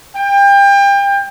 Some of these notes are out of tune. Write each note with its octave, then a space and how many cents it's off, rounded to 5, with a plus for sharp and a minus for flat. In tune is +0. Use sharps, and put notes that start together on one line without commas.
G5 +30